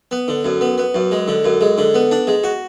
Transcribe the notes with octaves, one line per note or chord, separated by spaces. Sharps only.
B3
D3
F#2
B3
B3
F#2
G#3
D3
F#2
G#3
D3
B3
D4
G#3
F#4